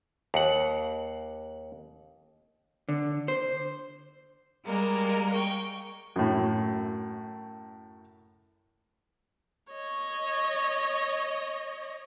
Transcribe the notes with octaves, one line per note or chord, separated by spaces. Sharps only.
D#2 F#5
D3
C5
G3 G#3 A#3 A#4
G5 C#6
F#2 A2
C#5 D#5